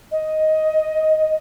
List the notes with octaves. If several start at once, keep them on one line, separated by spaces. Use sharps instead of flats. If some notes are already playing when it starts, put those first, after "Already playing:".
D#5